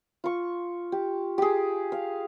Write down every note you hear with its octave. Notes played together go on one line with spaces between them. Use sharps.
F4 C#6
G4
G4 G#4
F5